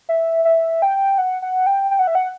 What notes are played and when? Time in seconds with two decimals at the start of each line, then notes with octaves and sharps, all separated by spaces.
0.09 E5
0.45 E5
0.82 G5
1.18 F#5
1.42 F#5
1.67 G5
1.91 G5
1.99 F#5
2.07 E5
2.15 F#5